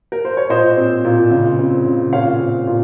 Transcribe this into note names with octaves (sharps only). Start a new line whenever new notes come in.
A#4
C5
C#5
A#2 C5 D#5
C4
A#2
C#3
C4
C#3
A#2 C#5 F5
C4
A#2